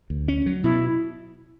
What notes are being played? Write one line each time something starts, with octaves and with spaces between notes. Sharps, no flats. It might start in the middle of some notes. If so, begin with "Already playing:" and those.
D2
C#4
F#3
B2 E4